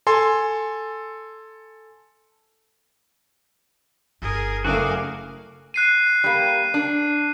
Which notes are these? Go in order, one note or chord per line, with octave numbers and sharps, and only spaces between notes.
A4 G#5 C6
G1 G#4 A#4
F#1 A3 F#4 G#4 A#4 F5 D6
F#6 C7 D#7
G3 A#3
D4